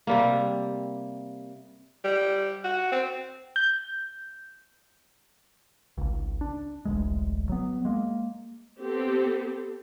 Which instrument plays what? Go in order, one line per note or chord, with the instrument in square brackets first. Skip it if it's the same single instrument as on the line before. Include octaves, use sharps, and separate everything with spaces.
[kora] C3 G3 A#3
[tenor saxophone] G3
F#4
C4
[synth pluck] G6
[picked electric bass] G#1 C#2
D4
D1 A1 D2 G#3
F#3 B3
G#3 A#3
[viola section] B3 C4 G4 A4